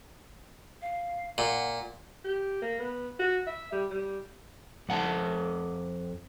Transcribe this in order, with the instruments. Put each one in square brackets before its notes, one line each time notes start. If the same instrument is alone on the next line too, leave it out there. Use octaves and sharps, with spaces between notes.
[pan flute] F5
[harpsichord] A#2 [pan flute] F#5
[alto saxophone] G4
A#3
B3
F#4
E5
G3
G3
[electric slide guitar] F2 F#5 G#5 A5